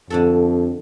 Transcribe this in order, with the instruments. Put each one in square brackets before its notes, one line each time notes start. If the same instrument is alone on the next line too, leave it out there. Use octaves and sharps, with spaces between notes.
[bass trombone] F2 [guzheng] D3 D4 A4